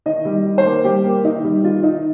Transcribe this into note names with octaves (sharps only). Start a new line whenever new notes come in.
D#3 D#5
G3
D#3
C5
A#3
G3 G4
A#3
D#3 D#4
G3
D#3 F4
D#3 D#4